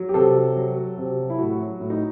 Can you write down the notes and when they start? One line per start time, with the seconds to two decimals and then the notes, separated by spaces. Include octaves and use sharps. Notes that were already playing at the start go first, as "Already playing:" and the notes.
Already playing: F#3
0.09 G4
0.14 C3 A4
0.35 F#3
0.56 F#3
0.77 F#3
0.97 C3
1.18 F#3
1.30 E4
1.38 A2 F#4
1.60 F#3
1.80 A2
1.90 D#4